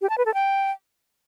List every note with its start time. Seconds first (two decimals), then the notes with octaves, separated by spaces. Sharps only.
0.01 G4
0.10 A5
0.18 B4
0.26 A4
0.34 G5